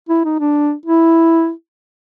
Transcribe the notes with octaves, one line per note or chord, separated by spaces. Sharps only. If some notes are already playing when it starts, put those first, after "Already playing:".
E4
D#4
D4
E4